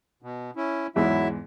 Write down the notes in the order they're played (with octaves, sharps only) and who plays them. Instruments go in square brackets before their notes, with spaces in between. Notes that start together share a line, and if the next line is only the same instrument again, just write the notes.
[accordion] B2
C#4 E4
[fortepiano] E2 G#2 [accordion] F#3 E4 E5